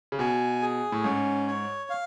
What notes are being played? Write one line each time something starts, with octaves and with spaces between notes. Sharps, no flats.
C#3
B2 G#5
G#4
A2
G#2 C#4
C#5
F5